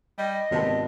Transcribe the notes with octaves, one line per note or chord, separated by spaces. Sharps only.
G3 D#5
G#1 C3 B3 A5